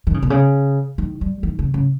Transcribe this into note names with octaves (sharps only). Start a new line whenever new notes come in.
D#3
C#3
B2
C#3
D#3
G3
D#3
C#3
C#3